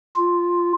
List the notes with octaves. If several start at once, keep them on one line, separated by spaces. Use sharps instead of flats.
F4